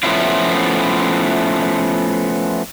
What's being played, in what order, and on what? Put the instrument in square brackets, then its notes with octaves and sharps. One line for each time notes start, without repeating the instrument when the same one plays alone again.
[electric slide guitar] F3 A3 B3 C#4 E4 F4